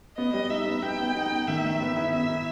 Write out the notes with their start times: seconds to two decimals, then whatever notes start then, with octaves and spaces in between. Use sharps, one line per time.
0.17 B3 D#5
0.33 G3
0.50 D#4 E5
0.67 B3
0.83 D#4 G5
0.99 B3
1.15 D#4
1.32 B3
1.48 D#3 E5
1.64 D#3
1.81 B3
1.97 E4
2.13 B3 E5
2.30 E4